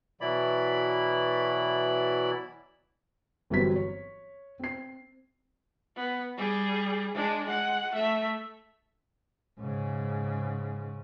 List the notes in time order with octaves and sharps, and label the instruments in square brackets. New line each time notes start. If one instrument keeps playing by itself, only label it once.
[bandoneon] B2 E3 F#3 E4 D5 B5
[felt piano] G1 E3 F#3 G3 C4 B6
C#5
C4 C7
[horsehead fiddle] B3
G3 G#4
G#3 D4
G#3 F#5
A3 E5
[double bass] G#2 C#3